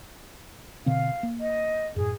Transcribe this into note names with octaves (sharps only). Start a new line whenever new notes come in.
B2 D3 C4 F5
A#3
D#5
F#2 A2 G#4